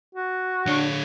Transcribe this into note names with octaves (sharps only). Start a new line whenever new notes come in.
F#4
D3 D4 C#5